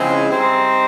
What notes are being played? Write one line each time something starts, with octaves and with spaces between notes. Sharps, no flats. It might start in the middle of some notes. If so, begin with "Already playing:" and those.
Already playing: C#3 F3 G#3 C4 E4
G3 C4 D#4